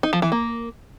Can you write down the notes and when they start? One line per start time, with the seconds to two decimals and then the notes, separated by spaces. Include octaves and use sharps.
0.03 D#4
0.13 F3
0.22 E3
0.32 A#3